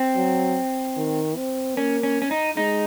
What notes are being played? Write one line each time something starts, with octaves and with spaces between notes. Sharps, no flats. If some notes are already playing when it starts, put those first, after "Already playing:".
Already playing: C4
F#3
D#3
C4
A#3 C#4
C#4
C#4
D#4
G#3 D#4